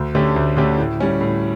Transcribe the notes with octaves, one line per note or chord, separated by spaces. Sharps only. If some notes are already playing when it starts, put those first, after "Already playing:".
Already playing: D2
D3 A3 C#4 G4
D2
D3 A3 C#4 G4
A2
G3 C#4
A2